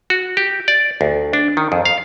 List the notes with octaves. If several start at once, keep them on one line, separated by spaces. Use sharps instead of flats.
F#4
G4
D5
D2
D4
D#3
F2
F5